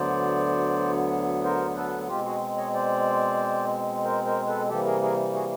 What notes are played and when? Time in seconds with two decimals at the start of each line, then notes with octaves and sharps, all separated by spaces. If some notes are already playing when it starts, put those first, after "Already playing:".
Already playing: D2 D3 F#3 B3 C5 D5
1.43 A#4 C5
1.76 A4 B4
2.08 B2 G#3 C4 F4 G4
2.24 F#4 G#4
2.57 C#5 D#5
2.74 C5 D5
4.04 A#4 C5
4.25 A#4 C5
4.47 A4 B4
4.69 C3 E3 G3 A#3 G4 A4
4.85 G#4 A#4
5.02 G#4 A#4
5.33 F#4 G#4